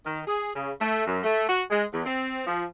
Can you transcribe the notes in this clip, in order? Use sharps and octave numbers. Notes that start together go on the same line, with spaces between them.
D#3
G#4
C#3
A3
F#2
A3
F#4
G#3
E2
C4
F3